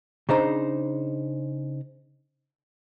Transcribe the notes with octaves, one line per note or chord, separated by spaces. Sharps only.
C#3 D4 D#4 C5 A#5